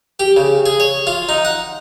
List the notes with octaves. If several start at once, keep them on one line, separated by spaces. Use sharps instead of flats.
G4
C#3
G#4
C#5
F4
D#4
F#5